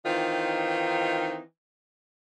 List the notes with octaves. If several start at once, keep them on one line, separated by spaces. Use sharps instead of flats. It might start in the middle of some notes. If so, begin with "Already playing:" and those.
D#3 E3 C4 D#4 F4